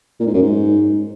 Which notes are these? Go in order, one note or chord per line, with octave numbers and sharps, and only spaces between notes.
A#2
G#2
F#2
G#2